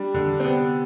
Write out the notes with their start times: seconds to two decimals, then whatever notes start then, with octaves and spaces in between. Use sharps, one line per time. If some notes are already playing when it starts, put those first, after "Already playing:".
Already playing: G3 D4
0.14 D3
0.40 C4
0.44 C3 B3